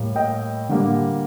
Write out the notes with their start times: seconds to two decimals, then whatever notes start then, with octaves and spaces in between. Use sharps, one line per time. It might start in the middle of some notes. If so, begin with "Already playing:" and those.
Already playing: A2 G3 A#3
0.16 D#5 G5
0.69 D3 G3 A#3